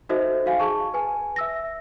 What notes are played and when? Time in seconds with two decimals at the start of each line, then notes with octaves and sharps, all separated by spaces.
0.09 D#4 F#4 A4 C5 D#5 E5
0.46 F#4 F5 G#5
0.59 G#4 A5 C#6
0.94 B4 G#5
1.36 E5 E6 A#6